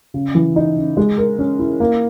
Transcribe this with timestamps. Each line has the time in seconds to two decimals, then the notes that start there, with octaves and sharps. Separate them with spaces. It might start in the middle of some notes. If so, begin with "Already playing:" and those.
0.14 C#3
0.35 E3
0.56 D#4
0.76 C#3
0.97 G#3
1.18 A#4
1.39 C#4
1.59 E4
1.80 A#3